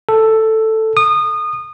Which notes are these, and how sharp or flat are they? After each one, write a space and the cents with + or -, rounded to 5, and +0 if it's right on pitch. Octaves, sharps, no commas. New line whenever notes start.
A4 +5
D#6 -25